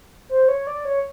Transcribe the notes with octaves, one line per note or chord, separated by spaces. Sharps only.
C5
C#5
D5
C#5